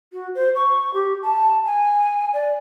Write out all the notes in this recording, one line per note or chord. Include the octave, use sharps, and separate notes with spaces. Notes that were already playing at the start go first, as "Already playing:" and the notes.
F#4
C5
C#6
G4
A5
G#5
D5